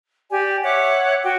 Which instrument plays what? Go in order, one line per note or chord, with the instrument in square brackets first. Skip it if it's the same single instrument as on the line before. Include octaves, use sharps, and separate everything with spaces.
[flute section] G4 D5 G#5
C#5 E5 F#5 D6
F#4 G5